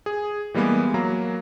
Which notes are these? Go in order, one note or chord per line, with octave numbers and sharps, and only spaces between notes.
G#4
E3 G3 G#3 A#3 B3
F#3 A#3 A#5